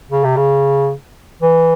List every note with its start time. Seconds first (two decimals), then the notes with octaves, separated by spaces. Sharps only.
0.11 C#3
0.24 C3
0.36 C#3
1.42 E3